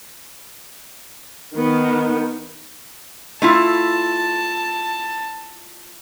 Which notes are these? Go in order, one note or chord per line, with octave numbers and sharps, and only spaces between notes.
D#3 B3
A3 E4 F4 A5